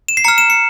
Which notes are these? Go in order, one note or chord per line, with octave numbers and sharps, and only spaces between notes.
E7
C7
A#5 F6 C#7
E7
C#7